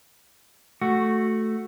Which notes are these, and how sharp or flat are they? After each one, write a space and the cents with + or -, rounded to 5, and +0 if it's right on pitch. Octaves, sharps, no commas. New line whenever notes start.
A3 +0 F#4 +0